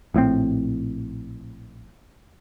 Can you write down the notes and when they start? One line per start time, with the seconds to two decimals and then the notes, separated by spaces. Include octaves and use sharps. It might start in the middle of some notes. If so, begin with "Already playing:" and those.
0.14 A#1 A2 C3 C4